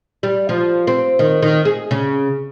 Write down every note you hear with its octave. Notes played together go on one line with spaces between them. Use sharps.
G3
F3
C4
D#3
D#3
G#4
C#3